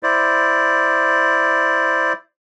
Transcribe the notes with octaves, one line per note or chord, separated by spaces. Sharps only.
E4 C5 D5